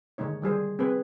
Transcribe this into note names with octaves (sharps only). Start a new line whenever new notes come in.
D3 D#3 G#3 D#4 C#5
D#3 G3 G#4 C5
C4 G#4 B4